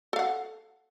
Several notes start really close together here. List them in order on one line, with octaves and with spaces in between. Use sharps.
A4 F5 F#5